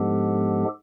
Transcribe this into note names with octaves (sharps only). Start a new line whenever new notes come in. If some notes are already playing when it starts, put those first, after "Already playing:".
Already playing: G#2 F3 G#3 B3 D4 G4 A4